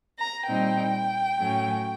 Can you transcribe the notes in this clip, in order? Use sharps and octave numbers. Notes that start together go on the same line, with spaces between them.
A#5
A#2 G3 C4 D#4 G5
A2 F#3 A3 C#4